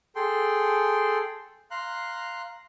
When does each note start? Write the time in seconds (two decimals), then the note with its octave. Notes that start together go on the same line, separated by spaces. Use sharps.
0.16 G#4 A4 G5 C6
1.71 F5 A#5 C6 F#6